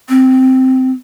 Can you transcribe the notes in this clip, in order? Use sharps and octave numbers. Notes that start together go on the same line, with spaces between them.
C4